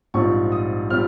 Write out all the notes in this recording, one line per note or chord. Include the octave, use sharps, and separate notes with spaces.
A#1 G#2 G3 C4 F4 C#6
D#6
G3 C4 F4 F6